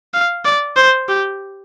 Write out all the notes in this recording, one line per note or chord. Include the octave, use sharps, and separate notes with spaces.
F5
D5
C5
G4